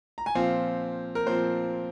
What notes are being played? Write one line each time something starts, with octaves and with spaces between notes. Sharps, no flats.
A#5
G#5
A#2 F3 C4 F5
A#4
A#2 F3 C4 C5